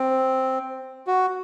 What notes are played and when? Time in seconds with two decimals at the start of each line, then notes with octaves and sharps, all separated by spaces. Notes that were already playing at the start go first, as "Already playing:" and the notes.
Already playing: C4
1.07 F#4